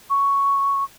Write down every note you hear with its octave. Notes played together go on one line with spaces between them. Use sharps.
C#6